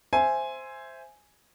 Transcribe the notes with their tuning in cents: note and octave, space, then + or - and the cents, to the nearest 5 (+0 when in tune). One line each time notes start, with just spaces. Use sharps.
C5 +0 E5 +10 G#5 +0